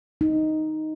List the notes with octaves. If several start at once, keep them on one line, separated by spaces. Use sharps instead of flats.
D#4